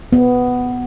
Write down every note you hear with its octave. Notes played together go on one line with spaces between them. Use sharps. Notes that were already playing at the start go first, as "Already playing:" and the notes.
B3